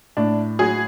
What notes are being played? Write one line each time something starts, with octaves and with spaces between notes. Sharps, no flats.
A2 D4
F#3 G#4